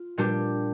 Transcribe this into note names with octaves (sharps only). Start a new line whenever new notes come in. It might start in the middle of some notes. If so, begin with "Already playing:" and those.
Already playing: F4
A#2 G3 D4 G4